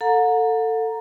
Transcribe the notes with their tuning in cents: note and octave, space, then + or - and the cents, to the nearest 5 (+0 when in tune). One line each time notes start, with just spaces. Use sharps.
A4 +20 F#5 -40 A#5 +0